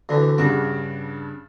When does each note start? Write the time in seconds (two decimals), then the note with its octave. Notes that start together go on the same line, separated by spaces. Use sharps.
0.09 D2 D3 E3
0.38 G2 C#3 D4 F#4